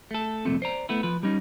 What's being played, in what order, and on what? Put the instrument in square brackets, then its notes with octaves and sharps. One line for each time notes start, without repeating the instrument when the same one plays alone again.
[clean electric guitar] A3 A4
C2 F2 A#2 A3 C4
C5 D5 A#5
A3 B3 E4
F3 B4
G3 C#4 D#4